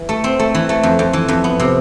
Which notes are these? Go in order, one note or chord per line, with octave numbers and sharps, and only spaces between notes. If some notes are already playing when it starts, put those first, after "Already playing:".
Already playing: E3
A3
C4
A3
E3
A3
F2
F2
E3
F2
B3
C3